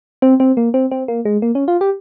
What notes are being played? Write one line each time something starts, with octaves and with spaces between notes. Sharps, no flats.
C4
C4
A#3
C4
C4
A#3
G#3
A#3
C#4
F4
G4